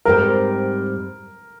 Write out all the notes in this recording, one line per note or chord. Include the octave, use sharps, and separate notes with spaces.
G#2 G3 C4 G4 A#4 C5